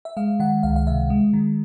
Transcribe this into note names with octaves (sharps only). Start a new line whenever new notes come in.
E5
G#3 F5
D#3 F#5
C#2 F5
F5
C3 E5
G#3
D#3